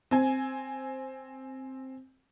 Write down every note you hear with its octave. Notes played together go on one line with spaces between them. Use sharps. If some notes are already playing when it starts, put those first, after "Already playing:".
C4 G#5